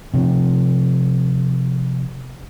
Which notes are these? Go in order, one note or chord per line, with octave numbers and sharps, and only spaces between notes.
C3 F3